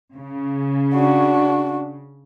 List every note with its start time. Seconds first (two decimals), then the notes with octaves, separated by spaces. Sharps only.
0.15 C#3
0.94 D4 F#4